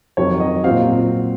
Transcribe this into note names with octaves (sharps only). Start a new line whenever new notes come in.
F2 D#3 F#3 C#5
D#5
A#2 F#3 C4 F5